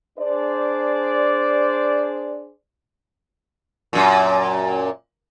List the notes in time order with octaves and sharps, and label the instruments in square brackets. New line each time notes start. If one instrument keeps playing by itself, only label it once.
[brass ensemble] D4 G#4 C5 D5
[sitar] F#2 A#2